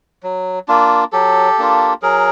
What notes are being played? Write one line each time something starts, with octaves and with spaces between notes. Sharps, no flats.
F#3
A#3 D4 F4
F#3 G4 A4
A#3 D4 F4
F#3 G#4 A#4